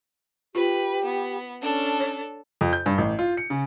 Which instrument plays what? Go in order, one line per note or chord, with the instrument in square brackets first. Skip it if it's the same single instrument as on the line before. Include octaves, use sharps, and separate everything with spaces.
[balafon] F4 [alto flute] G4 [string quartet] B4
[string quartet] B3
[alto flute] C#4 [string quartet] D4 A4
[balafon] C#5
[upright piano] F2
G6
G2
A1
F4
C#7
C#3